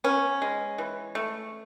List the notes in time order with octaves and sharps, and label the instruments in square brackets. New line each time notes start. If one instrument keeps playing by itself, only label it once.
[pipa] B3 C#4
G#3
E3
A3